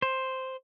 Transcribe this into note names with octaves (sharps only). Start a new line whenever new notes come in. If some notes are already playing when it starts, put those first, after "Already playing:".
C5